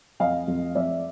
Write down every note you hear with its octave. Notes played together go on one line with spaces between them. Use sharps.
F2 D#5 F5
F2
F2 D5 E5